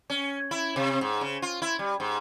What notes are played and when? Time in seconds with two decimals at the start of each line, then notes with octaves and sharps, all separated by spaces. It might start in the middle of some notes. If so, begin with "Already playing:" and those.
0.10 C#4
0.51 E4
0.76 C3
1.01 G#2
1.21 C#3
1.42 F4
1.62 E4
1.79 G3
2.00 G#2